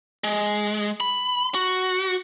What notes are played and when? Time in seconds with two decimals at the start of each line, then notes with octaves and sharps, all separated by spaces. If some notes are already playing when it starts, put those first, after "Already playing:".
0.24 G#3
1.00 B5
1.55 F#4